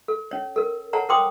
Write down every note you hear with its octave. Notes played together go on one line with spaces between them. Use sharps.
A4
C#4 C#5
A4 A#4
A4 C#5 F#5 A5 A#5
A#4 C5 G5 C6 D6 D#6